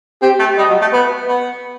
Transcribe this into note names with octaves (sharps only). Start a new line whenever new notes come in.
C4 G4
A3
G3 D#5
F#3
A3
B3 B4
B3